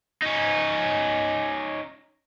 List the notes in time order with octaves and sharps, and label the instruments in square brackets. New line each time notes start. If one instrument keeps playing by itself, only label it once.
[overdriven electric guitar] C#4 D#4